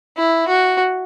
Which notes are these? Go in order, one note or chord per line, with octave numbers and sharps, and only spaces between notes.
E4
F#4